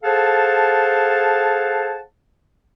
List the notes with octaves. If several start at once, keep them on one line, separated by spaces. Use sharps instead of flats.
G#4 A4 C5 F5 F#5 A5